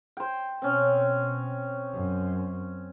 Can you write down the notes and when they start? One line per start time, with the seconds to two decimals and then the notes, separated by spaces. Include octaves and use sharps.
0.17 C5 G5
0.62 B2 C4 C#4
1.93 F#2